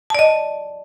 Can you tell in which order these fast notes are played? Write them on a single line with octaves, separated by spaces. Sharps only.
A5 D5 D#5